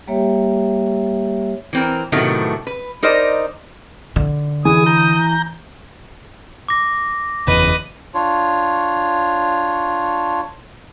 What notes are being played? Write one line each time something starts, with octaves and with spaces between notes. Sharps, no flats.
G3 A#3 G4 C#5 E5
E3 C4 A#4
A2 C3 D#3 F#3 A3 B3
B4
D#4 A#4 C5 D5 D#5
D3
E3 G#4 G#5 D#6
A#5 G6
D6 A#6
F#1 E2 C#3 B4 D#5
D4 F4 C#5